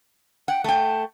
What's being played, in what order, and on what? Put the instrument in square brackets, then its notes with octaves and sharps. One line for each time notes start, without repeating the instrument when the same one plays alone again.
[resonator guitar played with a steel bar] F#5 [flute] G5
[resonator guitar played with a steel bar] A3 G5 [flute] A5